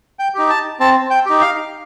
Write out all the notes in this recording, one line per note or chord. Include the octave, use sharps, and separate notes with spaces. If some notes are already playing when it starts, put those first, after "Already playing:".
G5
D#4 G4
A5
C4 A5
G5
D#4 G4
F5